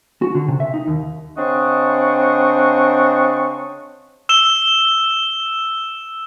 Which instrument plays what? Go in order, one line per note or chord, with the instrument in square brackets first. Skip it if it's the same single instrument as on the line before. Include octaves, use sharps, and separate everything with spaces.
[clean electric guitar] F#4
D3
C3
E5
D#4
D#2
[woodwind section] C#3 C4 D4 D#5 F#5 C#6
[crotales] E6 E7 G7